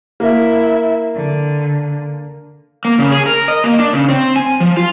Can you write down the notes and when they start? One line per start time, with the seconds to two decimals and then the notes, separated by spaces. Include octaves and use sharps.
0.20 A#3 E4 E5
1.15 D3
2.85 A#3
2.98 C#3
3.12 G#4
3.26 A#4
3.48 D#5
3.64 A#3
3.79 D4
3.93 C#3
4.09 C4
4.36 G#5
4.60 F3
4.77 F4